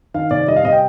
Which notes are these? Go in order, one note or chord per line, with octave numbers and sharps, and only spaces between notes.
D#3 F5
C3 D5
G3 D#5
F5
C3 D#5
G5